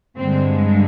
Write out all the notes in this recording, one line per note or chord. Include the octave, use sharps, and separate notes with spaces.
G2 D3 G#3 C4